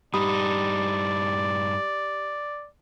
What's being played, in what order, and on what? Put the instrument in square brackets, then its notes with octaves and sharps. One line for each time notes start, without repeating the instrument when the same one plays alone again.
[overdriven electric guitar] G2 D#4 [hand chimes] G4 B5 D#6 [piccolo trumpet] D5